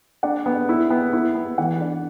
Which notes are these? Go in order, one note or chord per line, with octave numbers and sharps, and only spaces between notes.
D4 F#5
B3
E4
B3
E4
B3
E3 F#5
D4